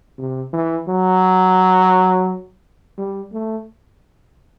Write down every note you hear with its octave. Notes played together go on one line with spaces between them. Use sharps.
C3
E3
F#3
G3
A3